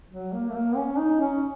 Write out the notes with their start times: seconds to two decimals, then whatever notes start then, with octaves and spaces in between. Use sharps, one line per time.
0.11 F#3
0.33 A#3
0.49 A3
0.55 A#3
0.76 C#4
0.98 D#4
1.20 C#4